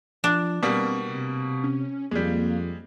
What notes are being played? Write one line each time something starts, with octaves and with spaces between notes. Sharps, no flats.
F3 D4
B2 G3 A#3 C4
C3
C#4
F2 G3 G#3 A#3